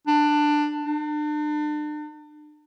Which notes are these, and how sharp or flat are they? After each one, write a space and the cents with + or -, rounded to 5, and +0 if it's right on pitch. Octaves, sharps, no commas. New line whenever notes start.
D4 +15
D4 +40